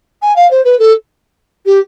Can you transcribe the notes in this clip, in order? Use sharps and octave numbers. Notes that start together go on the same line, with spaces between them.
G#5
F5
C5
B4
A4
G4